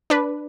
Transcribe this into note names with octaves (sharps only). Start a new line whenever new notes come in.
D4 B4